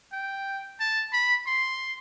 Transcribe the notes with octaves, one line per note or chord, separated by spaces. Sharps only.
G5
A5
B5
C6